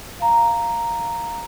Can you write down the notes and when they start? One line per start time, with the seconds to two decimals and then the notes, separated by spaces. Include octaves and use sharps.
0.20 F5 A#5